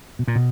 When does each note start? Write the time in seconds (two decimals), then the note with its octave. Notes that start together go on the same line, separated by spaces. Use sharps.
0.19 B2
0.28 A#2
0.36 B2